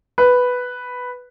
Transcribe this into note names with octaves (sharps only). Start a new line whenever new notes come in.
B4